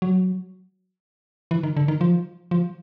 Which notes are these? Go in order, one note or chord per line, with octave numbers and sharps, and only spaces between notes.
F#3
E3
D#3
D3
D#3
F3
F3